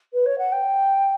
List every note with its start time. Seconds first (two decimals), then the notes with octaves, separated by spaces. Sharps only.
0.13 B4
0.25 C#5
0.38 F#5
0.52 G5